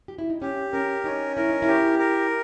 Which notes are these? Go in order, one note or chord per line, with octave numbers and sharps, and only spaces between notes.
G4
E4
D#4
C#4 G4
C#4 A#4
C#4 D#4
E4 A#4
D#4
E4
G4
A#4